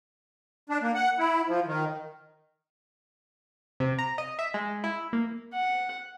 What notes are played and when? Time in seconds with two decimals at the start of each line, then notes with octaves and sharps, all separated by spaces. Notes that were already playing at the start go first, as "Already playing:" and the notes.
0.70 D4
0.82 A#3
0.95 F#5
1.19 E4
1.48 F3
1.67 D#3
3.80 C3
3.99 A#5
4.18 D#5
4.39 E5
4.54 G#3
4.84 E4
5.13 A#3
5.53 F#5